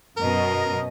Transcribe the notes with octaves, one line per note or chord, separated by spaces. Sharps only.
F#2 B2 A#4 D#5